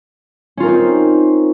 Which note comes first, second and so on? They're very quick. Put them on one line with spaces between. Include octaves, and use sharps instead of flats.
C#4 F4 A#4 D#4 C4